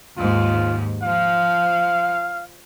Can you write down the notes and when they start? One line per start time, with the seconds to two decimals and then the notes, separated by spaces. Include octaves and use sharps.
0.17 D#2 G#2 F4
1.03 F3 F5